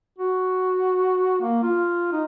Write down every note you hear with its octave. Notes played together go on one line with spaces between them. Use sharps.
F#4
A#3
F4
D#4